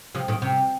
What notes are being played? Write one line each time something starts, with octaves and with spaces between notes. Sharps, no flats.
C3 F3
A#2 D#3
C3